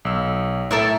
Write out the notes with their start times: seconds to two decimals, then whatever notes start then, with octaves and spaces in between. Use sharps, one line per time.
0.05 B1 E6
0.71 A2 A4 A#4 E5